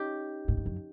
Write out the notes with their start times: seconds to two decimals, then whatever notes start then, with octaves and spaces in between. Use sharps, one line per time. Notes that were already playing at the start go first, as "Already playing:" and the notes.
Already playing: C#4 D#4 G4
0.48 G#2
0.57 G2
0.66 F#2